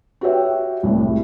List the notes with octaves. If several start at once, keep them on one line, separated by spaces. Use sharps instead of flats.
F#4 G4 B4 C#5 E5 G5
C2 A2